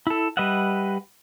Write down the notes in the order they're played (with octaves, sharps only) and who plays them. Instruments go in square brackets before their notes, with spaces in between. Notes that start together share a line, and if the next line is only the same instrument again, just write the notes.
[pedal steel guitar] E4 A4
G3 B4 D#5 E5 F#5